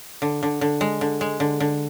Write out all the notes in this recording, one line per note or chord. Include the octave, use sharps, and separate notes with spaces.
D3
D3
D3
G#3
D3
G#3
D3
D3